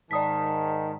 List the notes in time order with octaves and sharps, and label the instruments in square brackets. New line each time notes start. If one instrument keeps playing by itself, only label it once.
[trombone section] G#2 D#3 [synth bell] D5 D#6 B6 [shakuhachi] A5